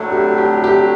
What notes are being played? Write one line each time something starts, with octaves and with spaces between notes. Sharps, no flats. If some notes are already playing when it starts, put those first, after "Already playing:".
Already playing: A2 F#3 A3 D4 A4
G4
G4
G4